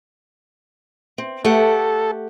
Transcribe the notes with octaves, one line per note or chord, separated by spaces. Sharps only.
C4
A3 G4 A4 F#5